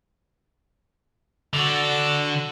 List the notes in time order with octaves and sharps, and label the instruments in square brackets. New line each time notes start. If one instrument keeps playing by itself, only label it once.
[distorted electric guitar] D3 [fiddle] F#4 A4